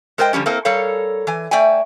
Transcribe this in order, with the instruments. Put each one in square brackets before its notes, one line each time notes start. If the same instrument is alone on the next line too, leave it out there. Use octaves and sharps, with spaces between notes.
[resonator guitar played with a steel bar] G#3 A#4 C5 D#5 G5
D3 F3 G3 C#4
A#3 C4 E4 A4 A#4
G3 A4 A#4 C#5 F5
E3 G#5
A3 D5 E5 G5 G#5